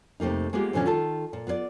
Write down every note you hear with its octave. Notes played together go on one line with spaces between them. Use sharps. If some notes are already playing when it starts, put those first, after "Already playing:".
F2 C3 A3 A#3 D#4
G#3 A#3 B3 F4 G4 G#4
G#2 B2 D3 E3 F3 C#4
D#3 F4 A4 A5
A#2
B3 F4 A#4 D5